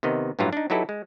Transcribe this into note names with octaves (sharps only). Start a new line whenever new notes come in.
C3 D#3 B3 D#5
A1 G2 E3 F#3 F4 A#5
D4 D#4
F#3 D#4 E4 G4 A4 B4
G#3